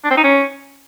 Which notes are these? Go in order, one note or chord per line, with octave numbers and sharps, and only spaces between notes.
D4
C4
D#4
C#4